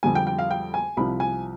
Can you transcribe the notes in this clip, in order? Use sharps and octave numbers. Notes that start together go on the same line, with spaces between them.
F2 D3 G3 G#5
G5
G5
F5
G5
G#5
C2 C3 F3 B5
G#5